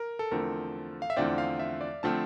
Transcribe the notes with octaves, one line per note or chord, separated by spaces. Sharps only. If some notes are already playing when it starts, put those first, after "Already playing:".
Already playing: A#4
A4
E2 D3 F3 A3 C4 A#4
F5
E5
E2 D3 F3 A3 C4 D5
F5
E5
D5
D3 F3 A3 C4 A5